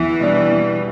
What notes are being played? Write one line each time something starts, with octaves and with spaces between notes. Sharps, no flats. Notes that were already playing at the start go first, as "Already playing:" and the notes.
Already playing: E2 E3
B2 G3 D4
E2